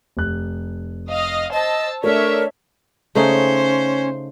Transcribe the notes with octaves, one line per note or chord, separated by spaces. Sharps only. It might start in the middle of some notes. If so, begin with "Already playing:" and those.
F1 F#6
D#5 F5 F6
C5 D#5 A5 E6
A3 D4 A#4 C#5 E5
C#3 A3 C#4 D#4 C5